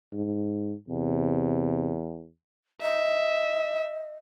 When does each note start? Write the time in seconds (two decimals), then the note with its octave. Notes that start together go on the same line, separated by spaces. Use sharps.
0.13 G#2
0.88 E2 C3
2.82 D#5 E5